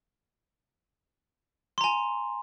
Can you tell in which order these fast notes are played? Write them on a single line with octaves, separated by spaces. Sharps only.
C6 A#5 G#5